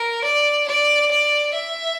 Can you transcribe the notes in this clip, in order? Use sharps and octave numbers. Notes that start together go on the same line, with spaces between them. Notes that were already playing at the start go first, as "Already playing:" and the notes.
Already playing: A#4
D5
D5
D5
E5